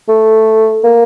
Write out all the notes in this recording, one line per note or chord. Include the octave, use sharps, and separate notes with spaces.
A3
A#3